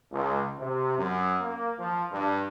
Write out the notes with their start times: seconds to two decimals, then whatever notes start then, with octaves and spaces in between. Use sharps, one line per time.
0.11 C#2
0.58 C3
0.97 F#2
1.40 A#3
1.79 F3
2.11 G2